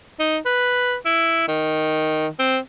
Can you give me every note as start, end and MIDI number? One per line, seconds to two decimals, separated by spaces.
0.20 0.37 63
0.46 0.95 71
1.05 1.44 64
1.48 2.28 51
2.39 2.58 60